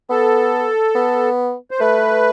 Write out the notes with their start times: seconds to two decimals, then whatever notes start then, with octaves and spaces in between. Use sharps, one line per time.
0.10 B3 A4
0.95 B3
1.71 C5
1.79 A3 B4